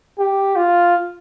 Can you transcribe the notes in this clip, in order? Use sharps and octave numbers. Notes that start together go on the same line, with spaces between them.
G4
F4